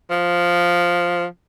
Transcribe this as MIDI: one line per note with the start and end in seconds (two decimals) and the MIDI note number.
0.11 1.25 53